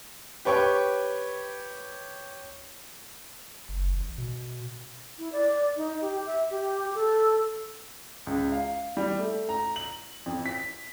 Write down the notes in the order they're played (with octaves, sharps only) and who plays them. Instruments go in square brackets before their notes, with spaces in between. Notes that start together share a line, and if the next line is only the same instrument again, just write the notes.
[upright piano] G4 B4 C#5 G5 C#6
[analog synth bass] F#1
A1
B2
[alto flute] E4
D5
D#4
G4
E5
G4
A4
[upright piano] C#2
F5
G3
A3
A#5
F#7
F2
B6